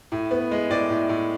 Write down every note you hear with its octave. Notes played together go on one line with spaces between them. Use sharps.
A2
B3
G#3
A2 D5
A2
A2